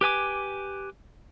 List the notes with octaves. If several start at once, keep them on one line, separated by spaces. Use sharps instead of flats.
G4 B4 G#5 D6